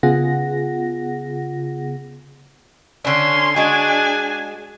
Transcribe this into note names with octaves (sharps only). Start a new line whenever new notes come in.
C#3 B3 F4 G#4 F#5 A#6
D3 C#4 D4 C6
G#3 D4 F#4 G#5